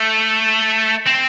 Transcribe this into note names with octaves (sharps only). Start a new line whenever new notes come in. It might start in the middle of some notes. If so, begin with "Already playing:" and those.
Already playing: A3
C4